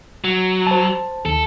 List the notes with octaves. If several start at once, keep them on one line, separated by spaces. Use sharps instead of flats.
F#3
C5 A5
D#2 A4